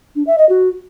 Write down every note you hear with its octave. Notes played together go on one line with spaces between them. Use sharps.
D4
E5
D#5
F#4